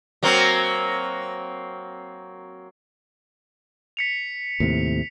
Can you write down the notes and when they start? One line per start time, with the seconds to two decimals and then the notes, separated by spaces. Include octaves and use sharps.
0.23 F#3 A#3 C4
3.97 B6 C#7 F7
4.60 D#2 A2 C3